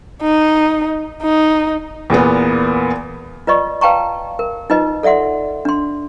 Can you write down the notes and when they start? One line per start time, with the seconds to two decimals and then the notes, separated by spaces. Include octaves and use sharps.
0.22 D#4
1.23 D#4
2.10 E2 A#2 A#3 B3
3.47 F4 B4 D5 D#5 C#6
3.81 B4 F5 G5 A5 A#5 C#6
4.39 A#4
4.70 D#4 F4 B4 D#5
5.03 A4 D5 E5 F#5 C6
5.65 D4 C6